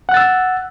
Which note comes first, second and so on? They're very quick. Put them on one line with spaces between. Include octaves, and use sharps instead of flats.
F#5 F#6 A6 E6